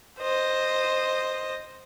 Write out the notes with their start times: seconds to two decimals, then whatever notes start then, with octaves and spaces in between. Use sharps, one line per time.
0.20 C5 D#5